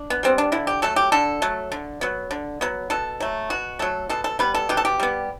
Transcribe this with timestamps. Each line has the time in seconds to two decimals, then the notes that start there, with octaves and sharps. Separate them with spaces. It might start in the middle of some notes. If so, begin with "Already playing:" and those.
Already playing: D4
0.10 B3
0.23 G3 B3 C4
0.38 D4
0.52 D3 E4
0.67 G4
0.82 F#3 A3 A4
0.96 G4
1.12 D3 A4
1.42 F#3 A3
1.72 D3
2.01 F#3 B3
2.31 D3
2.61 F#3 B3
2.90 B2 A4
3.20 F#3 A3
3.50 B2 F#4
3.79 F#3 A3 A4
4.09 B2 A4
4.24 A4
4.39 G3 B3 B4
4.54 A4
4.69 B2 G4
4.77 A4
4.85 G4
5.00 G3 B3